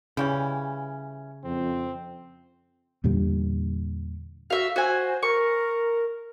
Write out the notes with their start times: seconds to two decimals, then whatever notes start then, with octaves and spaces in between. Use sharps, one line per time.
0.17 C#3 E3 G3 C#4
1.45 F2 C4
3.04 E2 A#2 D3 G3
4.50 F#4 E5 F5
4.76 F#4 C5 G#5
5.23 A#4 C#6